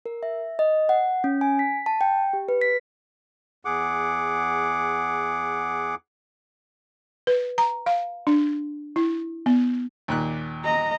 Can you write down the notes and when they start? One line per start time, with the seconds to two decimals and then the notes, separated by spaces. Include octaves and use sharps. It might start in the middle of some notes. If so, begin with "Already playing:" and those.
0.06 A#4
0.23 E5
0.59 D#5
0.89 F#5
1.24 C#4
1.41 G#5
1.59 B6
1.86 A5
2.01 G5
2.33 G4
2.49 B4
2.61 B6
3.65 E2 G#4 F#5 D6
7.27 B4
7.58 A#5
7.86 F5
8.27 D4
8.96 E4
9.46 B3
10.08 D#2 A#2 F#6
10.64 D#5 A#5